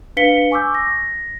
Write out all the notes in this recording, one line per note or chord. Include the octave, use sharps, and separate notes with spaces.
D4 B4 F5 B6 C#7 G7
G#5 C#6 D6 E6 G6
A#6